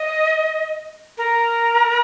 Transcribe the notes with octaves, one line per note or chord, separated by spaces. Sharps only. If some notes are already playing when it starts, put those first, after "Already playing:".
Already playing: D#5
A#4